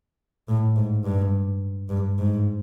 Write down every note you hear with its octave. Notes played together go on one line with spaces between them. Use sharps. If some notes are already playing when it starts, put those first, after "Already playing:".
A2
G#2
G2
G2
G#2